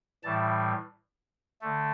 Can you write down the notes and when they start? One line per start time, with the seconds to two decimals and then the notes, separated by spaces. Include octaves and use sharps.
0.24 A2 E3 G3 A5
1.62 D3 A3